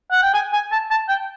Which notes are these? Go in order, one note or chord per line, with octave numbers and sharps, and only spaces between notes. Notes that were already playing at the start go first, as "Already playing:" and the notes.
F#5
G5
G#5
G#5
A5
A5
G5